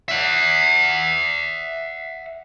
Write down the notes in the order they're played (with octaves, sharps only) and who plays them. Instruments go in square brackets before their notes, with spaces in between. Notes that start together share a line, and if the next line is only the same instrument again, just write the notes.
[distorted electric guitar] E5 F#5